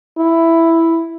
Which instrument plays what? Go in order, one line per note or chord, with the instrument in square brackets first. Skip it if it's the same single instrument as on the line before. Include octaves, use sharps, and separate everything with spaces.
[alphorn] E4